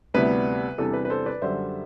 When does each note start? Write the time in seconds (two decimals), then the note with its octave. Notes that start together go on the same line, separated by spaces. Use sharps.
0.14 D2 C3 G3 B3 E4 B4
0.78 E2 C3 G3 D4 A4
0.93 B4
1.05 B4
1.10 A4 C5
1.26 B4 D5
1.42 F#2 D3 G3 D4 C5 E5